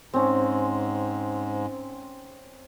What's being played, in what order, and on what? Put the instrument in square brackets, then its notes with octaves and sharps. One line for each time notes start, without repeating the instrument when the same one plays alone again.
[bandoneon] G#2 [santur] C4 C#4